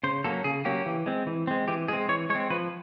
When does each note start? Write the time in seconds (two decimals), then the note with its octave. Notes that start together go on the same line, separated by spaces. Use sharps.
0.04 C#3 C5
0.24 F#3 A#3 C#4 A4
0.44 C#3 G#4
0.65 F#3 A#3 C#4 G4
0.86 E3
1.06 G#3 C4
1.27 E3
1.47 G#3 C4
1.68 E3 G4
1.88 G#3 C4 G#4
2.09 E3 C#5
2.30 G#3 C#5
2.35 C4
2.50 F3 B4